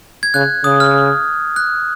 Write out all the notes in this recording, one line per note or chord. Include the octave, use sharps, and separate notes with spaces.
G#6
C#3 F#6
C#3 D#6
F6
F#6